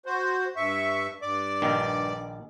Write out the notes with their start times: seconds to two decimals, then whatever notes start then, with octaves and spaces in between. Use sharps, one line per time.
0.06 F#4 C5
0.56 G2 E5 C#6
1.22 G2 D5 D6
1.62 A#1 D#3